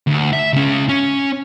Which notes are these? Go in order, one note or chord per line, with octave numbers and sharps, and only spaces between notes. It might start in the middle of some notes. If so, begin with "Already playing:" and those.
D2
E5
C#2 C#4
C#4